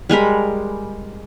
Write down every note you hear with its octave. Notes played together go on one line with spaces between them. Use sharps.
G3 G#3 A#4 B5